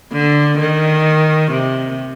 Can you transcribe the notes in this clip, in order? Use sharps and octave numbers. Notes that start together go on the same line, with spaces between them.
D3
D#3
C3